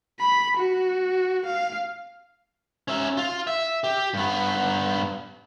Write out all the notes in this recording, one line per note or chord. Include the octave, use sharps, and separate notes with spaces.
B5
F#4
F5
C#4 E5
F4
E5
G4
G2 B3